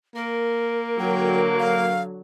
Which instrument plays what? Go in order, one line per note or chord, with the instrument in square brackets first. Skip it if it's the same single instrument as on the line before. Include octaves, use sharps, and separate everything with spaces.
[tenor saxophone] A#3 [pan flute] A#4
[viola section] D3 F#3 [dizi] G5
[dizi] F5